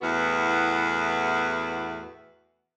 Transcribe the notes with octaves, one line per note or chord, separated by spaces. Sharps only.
E2 A2 B3 F#4 B4